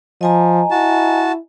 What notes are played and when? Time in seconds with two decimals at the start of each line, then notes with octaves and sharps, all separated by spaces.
0.21 F3 D#5 G#5 A#5
0.71 E4 F#4 A5